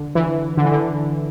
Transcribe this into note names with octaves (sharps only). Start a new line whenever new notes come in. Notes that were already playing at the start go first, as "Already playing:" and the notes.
Already playing: D3
E3
D3
E3
D3